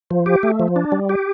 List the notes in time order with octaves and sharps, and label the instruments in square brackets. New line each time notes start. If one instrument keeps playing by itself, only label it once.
[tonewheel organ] F3
G4
A3
F3
D4
G3
G4